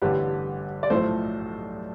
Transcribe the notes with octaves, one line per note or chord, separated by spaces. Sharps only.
A1 G2 D3 G3 G4 B4
D5
B1 A2 F3 A3 A4 C5